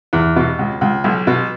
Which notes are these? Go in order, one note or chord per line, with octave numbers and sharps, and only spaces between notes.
E2
B2
C#2
C#2
B1
B2